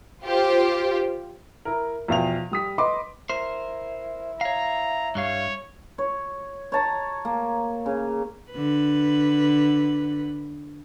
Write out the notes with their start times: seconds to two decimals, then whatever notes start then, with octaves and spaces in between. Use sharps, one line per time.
0.23 F4 G4 C5
1.65 E4 A#4
2.08 E2 B2 F3 F5 G5 F7
2.51 G3 D#6 B6
2.78 B4 D#5 B5 C6 D6
3.30 E4 A#4 C5
4.41 C#5 F5 A#5
5.15 G2 G3 C#5 F5
5.98 C#5
6.72 C#5 A5 A#5
7.25 A#3
7.86 C#3
8.52 D3 B4